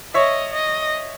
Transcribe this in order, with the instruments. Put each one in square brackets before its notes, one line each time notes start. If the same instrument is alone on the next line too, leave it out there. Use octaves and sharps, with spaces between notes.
[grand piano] C#5 E5 [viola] D#5
[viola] D#5